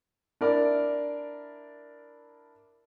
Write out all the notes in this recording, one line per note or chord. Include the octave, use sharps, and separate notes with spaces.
D4 E4 A#4 D5